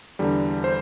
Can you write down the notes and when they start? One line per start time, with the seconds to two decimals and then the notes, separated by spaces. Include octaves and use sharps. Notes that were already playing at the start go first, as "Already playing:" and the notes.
0.19 E2 D3 G3
0.64 C5